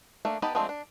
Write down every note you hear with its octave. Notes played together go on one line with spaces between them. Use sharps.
A3 A#3 D4
B3 D#4 G4 B4 A5
F3 G#3 A3 C4 D4
D4